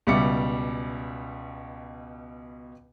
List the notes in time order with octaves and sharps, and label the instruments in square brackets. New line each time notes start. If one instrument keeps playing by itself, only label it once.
[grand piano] C#2 B2 G3 E5 D6 C#7